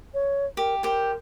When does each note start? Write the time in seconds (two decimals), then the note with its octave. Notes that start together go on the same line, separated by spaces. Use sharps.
0.14 C#5
0.57 G4 A#4
0.83 G4 A#4 C5